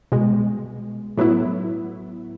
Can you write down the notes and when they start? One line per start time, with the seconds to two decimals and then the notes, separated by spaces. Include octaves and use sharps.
0.12 C2 B2 G#3
1.18 A2 F#3 B3 E4